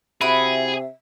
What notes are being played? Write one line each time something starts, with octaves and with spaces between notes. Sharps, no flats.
C3 E4 F#4 G#4 E5 B5